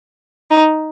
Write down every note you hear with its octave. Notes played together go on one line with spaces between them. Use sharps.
D#4